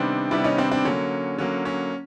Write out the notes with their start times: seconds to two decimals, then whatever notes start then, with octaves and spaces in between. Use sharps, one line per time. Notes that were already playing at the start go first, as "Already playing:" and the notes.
Already playing: C3 D#3 G3 B3 C4 D4
0.31 C3 D#3 G3 B3 D4 E4
0.44 C#4 D#4
0.58 C4 D4
0.71 C4 D4
0.85 D3 F#3 A#3 C#4
1.38 D3 F#3 A#3 C#4
1.65 C#4